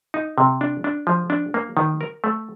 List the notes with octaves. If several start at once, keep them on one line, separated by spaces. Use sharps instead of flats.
D#4
C3
D4
D4
F3
D4
A#3
D#3
A#4
A3